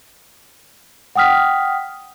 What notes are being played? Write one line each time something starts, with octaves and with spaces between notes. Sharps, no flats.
F#5 G5 D#6 F6 B6